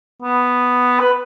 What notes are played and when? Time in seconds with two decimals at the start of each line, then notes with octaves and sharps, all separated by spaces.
0.22 B3
1.00 B4